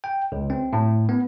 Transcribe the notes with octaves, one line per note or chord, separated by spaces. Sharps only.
G5
C#2
C4
A2
B3